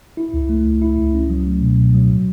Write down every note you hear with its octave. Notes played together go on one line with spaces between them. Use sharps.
E4
C#2
A3
C#2
E4
C#2
C#4
F#3
A3
B2
B2
F#3
A2